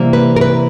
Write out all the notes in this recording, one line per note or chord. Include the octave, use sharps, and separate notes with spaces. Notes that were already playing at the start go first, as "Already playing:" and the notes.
Already playing: C3 E3 G3 A#3
B4
A#4
B4